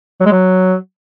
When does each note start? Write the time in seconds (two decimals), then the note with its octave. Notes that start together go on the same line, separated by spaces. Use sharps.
0.20 F#3
0.26 G#3
0.32 F#3